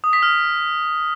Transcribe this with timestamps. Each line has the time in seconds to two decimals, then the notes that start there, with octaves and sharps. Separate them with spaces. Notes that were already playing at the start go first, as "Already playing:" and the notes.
0.04 D#6
0.13 B6
0.22 F6